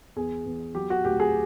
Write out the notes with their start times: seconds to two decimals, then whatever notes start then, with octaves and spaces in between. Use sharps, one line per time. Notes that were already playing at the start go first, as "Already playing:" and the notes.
0.16 E2 G#4
0.46 E2
0.75 F#3 G4
0.90 F#4
1.05 D2 G4
1.20 G#4